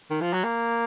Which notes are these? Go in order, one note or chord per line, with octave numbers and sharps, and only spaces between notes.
D#3
F3
F#3
A#3